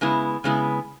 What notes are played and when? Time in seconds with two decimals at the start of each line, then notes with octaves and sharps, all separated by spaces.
0.01 C#3 G#3 B3 E4
0.44 C#3 G#3 B3 E4